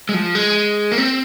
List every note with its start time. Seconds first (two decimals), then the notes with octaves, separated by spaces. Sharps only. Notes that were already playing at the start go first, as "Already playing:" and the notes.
0.09 G#3
0.14 F3
0.35 G#3
0.92 A#3
0.98 C4